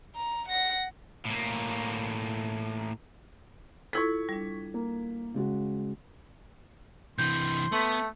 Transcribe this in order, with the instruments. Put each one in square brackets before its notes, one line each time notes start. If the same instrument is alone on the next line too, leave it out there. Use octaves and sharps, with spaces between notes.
[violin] A#5
F#5 A#6
[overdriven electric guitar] A2 A#3
[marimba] E4 F4 A4 [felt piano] C#6 G#6 B6
[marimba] G3 D4
[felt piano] A#3
C#3 G#3 F#4
[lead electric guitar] C3 E3 [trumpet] C6 [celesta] G6
[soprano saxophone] A3 [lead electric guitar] B3